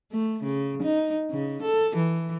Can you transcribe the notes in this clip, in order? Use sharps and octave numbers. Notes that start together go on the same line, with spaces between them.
A3
C#3
D#4
C#3
A4
E3